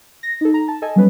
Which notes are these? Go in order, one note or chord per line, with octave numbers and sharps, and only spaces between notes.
A#6
D#4 A4
A#5
A5
A4 D#5 G#5 A5
F#3 G3 B3 C#4 B4